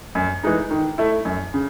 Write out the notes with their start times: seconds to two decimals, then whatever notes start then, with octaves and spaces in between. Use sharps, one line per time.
0.15 F#2
0.43 E3 G#3 D#4
0.71 D#3
0.98 A3 E4
1.25 F#2
1.54 C#3